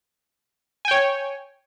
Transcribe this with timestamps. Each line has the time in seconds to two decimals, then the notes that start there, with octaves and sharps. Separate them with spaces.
0.85 G#5
0.88 G5
0.91 C#5